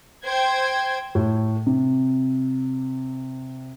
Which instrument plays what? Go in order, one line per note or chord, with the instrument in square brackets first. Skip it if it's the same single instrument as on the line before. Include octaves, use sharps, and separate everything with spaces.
[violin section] C5 G5 G#6
[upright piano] A2
C3